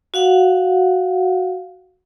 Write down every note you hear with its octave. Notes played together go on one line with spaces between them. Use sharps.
F#4 F5 F#5